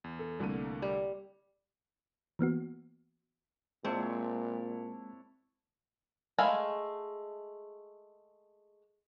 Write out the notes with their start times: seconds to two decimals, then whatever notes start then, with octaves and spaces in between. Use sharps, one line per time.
0.04 E2
0.19 A4
0.40 C2 D3 A3 A#3 D#7
0.82 G3
2.39 E3 A#3 B3 F#4
3.85 A#2 G#3 A#3 C4 D4 E4 C#5
6.38 G#3 A3 F5 G#5 B5